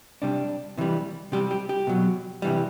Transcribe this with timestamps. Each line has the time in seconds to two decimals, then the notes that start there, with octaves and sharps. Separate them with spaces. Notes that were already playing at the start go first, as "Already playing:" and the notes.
0.22 C3 G3 D4
0.77 C3 E3 G3
1.32 C3 G3 G4
1.51 G4
1.69 G4
1.87 B2 F#3
2.42 C3 E3 G3